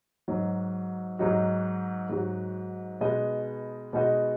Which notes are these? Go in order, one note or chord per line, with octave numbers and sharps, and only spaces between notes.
G#2 F#3 D#4 F#4
G#2 F#3 D#4 F#4
G#2 F#3 D#4 F#4
B2 G#3 D#4 F#4 D#5
B2 G#3 D#4 F#4 D#5